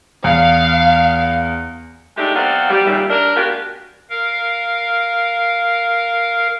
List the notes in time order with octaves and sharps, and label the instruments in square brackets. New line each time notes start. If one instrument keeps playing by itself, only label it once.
[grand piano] E2 [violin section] F5
[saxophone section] G#3 A3 D4 D#4 G4
F#3 B3 C4 D5 F5
G3
D#2 A#2 C#3 G3 E5
D4 A#4
G#3 A#3 B3 F#4 G4
[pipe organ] A#4 F5